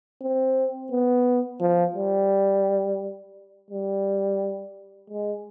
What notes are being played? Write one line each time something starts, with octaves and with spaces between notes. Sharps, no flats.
C4
B3
F3
G3
G3
G#3